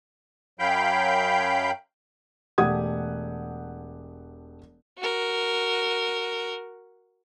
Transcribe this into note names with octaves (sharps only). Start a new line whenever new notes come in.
F#2 F#3 F5 G5 B5 G6
E1 A3 G4 F#5 D#6 G#6
F#4 A#4